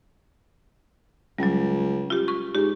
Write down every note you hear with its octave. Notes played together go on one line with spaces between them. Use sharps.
C#2 F#3 G3
F4 G4
C#6
G#2 G4